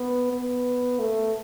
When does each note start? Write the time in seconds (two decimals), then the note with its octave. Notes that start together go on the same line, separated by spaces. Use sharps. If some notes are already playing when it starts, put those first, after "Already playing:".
Already playing: B3
0.33 B3
0.99 A3